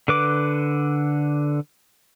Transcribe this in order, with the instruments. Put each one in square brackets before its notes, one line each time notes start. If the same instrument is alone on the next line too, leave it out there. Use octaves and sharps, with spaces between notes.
[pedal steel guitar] D3 B4 D6